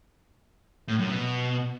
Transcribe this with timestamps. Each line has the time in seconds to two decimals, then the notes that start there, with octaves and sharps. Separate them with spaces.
0.88 A2
0.99 F#2
1.10 B2